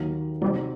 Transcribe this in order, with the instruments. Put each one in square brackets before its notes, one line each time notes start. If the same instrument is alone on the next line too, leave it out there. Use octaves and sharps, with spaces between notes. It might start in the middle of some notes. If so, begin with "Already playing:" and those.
Already playing: [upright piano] D#2 D#3 F#3 A#3
[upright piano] C3 F#3 C4 D#4 [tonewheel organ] G3